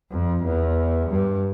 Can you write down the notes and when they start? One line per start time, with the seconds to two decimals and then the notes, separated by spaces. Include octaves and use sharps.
0.11 F2
0.44 E2
1.09 G2